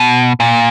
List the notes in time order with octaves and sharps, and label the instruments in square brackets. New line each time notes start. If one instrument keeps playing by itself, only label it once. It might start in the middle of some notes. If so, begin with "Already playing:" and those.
Already playing: [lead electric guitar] B2
A#2